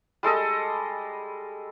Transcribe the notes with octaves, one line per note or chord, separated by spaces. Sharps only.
G3 G#3 A4 D#5